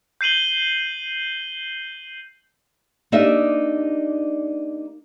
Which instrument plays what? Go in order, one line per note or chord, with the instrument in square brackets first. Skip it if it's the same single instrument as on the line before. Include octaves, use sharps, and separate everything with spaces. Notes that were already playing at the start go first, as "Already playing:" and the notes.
[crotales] G6 C7 D#7 F#7 G7
[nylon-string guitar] A#3 D4 D#4 G4 D#5 E5